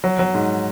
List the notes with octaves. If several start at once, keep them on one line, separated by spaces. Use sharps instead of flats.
F#3
F#3
G#2